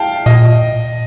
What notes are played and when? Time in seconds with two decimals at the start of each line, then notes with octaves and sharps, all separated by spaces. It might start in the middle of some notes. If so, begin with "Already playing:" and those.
Already playing: F5 G5 A5
0.26 A#2 D#5